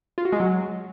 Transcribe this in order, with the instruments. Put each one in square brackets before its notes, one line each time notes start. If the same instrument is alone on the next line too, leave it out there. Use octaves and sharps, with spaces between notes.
[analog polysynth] F4
F#4
G#3
F#3